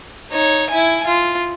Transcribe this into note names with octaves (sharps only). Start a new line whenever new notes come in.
D#4 C#5
E4 G#5
F4